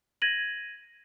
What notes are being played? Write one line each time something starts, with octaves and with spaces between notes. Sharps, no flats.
G#6 A#6 D#7 F#7